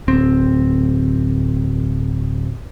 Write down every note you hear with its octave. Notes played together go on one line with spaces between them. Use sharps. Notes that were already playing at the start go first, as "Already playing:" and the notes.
D1 C4